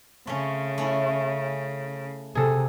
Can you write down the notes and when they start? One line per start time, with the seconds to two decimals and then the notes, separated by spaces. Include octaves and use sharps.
0.27 C#3 A3 C4 C#4
0.78 A3 C#4 E4
2.35 C3 G#4 A4